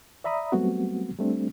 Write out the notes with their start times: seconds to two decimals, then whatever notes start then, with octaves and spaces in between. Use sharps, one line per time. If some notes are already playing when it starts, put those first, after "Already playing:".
0.24 D5 E5 A#5 B5 D#6
0.52 F#3 G3 A3 B3 C4 F#4
1.19 G3 A3 C4 D4